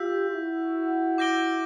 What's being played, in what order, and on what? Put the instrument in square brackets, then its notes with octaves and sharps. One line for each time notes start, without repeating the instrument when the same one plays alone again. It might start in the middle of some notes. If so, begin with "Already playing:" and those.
Already playing: [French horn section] F4 G4 [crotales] E6 G6 B6
[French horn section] E4 F#4
[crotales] D6 G6 A#6 D7 G7